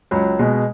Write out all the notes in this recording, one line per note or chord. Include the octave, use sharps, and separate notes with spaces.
C#2 F#3
B2 G#3